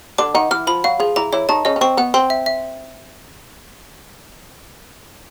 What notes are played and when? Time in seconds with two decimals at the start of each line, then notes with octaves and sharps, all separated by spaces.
0.18 D3 D4 D6
0.34 D#3 D#4 F#5
0.51 E3 E4 F6
0.67 F3 F4 B5
0.84 F#3 F#4 F5
1.00 F3 F4 G#4
1.16 E3 E4 A#5
1.33 E3 E4 C#5
1.49 D#3 D#4 A5
1.65 C#3 C#4 D#5
1.76 C#4
1.81 C4 C#6
1.97 B3 F#5
2.14 C4 C6
2.30 E5
2.46 E5